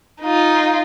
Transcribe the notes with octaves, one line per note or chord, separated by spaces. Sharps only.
D#4 F4